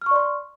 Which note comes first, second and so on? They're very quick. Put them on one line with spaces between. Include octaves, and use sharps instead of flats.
F6 C#6 D5 C6